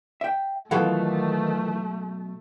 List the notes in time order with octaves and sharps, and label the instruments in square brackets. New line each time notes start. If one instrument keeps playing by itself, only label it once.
[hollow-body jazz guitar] E5 G5
[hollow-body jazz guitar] B2 F#3 F#5 [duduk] D#3 [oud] E3 F4 A4 [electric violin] A3